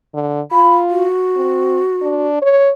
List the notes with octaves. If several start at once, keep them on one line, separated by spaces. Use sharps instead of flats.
D3
F4 B5
F#4
C4
D4
C#5